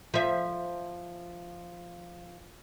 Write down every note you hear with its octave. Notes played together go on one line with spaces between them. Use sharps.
F3 E5